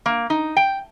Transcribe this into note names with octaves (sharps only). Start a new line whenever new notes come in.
A#3
D#4
G5